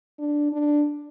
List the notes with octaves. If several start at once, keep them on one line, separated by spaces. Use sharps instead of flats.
D4
D4